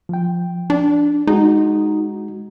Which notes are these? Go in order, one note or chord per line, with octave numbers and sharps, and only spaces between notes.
F3 G5
D4
G#3 D#4 F#4